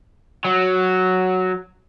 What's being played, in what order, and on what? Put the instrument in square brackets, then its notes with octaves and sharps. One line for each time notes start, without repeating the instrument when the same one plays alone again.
[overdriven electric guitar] F#3